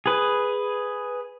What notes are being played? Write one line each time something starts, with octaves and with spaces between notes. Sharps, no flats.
G#4 B4